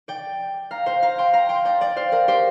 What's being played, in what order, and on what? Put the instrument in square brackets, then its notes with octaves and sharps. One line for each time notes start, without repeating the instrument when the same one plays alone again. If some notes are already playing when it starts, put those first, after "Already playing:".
[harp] D5 G5
F5 A#5
C5 F5
F5 A#5
G5 C6
F5 A#5
G5 C6
D5 G5
D5 G5
C5 F5
A#4 D5
G4 C5